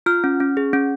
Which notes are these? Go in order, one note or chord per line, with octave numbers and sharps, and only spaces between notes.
F4 F6
C#4
C#4
G#4
C#4